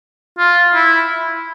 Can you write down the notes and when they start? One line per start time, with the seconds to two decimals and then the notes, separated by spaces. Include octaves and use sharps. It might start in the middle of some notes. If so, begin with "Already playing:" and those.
0.38 F4
0.74 E4